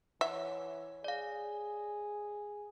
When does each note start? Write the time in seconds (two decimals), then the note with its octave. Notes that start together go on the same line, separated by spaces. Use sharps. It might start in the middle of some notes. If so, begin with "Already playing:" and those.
0.21 E3 C#5 E5 F#5
1.04 G#4 D5 F5